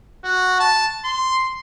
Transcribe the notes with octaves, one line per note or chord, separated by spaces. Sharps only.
F#4
A5
C6